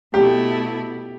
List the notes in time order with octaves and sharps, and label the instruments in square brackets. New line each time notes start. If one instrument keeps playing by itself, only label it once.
[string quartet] B2 A3 E4 [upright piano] G4